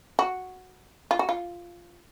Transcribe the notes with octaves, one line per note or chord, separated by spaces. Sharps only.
F#4
F4
F#4
F4